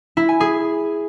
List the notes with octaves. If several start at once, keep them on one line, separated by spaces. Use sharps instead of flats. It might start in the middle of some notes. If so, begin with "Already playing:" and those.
E4
G#5
G#4